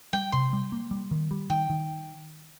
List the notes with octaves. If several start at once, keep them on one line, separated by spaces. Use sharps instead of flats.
G3 G5
C3 C6
G3
A#3
G3
D#3
G3
D#3 G5
D#3